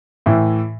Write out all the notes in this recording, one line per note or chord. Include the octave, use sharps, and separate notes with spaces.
A2 E3